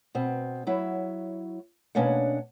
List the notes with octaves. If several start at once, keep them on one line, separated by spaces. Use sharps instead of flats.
B2 C4
F#3 E4 C#5
B2 A#3 C#4 D4 C#5 F#5